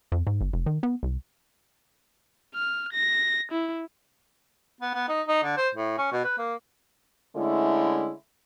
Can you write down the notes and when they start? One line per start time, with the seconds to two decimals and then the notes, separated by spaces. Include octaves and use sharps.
0.12 F2
0.27 G#2
0.41 G1
0.54 F1
0.66 D#3
0.83 B3
1.03 C2
2.55 F6
2.93 A#6
3.52 E4
4.81 B3
4.94 B3
5.09 D#4
5.28 D#4
5.44 D3
5.57 C5
5.75 A2
5.98 C#4
6.12 B2
6.25 B4
6.38 A#3
7.36 D3 G#3 A3 C#4 E4